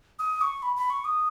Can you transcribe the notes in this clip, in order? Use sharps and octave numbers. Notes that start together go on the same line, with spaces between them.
D#6
C#6
B5
B5
C#6
D#6